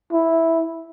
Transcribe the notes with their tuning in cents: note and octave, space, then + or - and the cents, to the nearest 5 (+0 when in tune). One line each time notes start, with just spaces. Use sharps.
E4 -5